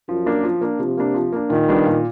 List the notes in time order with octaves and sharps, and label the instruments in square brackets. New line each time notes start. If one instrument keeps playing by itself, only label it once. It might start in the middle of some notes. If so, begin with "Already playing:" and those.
[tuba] F#2 [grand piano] F3
[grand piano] A#3 D4
F3
A#3 D4
[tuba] C3 [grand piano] F3
[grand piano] A#3 D4
F3
A#3 D4
[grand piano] A#2 [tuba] D#3
[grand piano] G3 B3 D4 F4
A#2